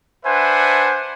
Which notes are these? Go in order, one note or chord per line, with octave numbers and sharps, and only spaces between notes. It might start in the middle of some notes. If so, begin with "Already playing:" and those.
D4 B4 C5 E5 F#5 G#5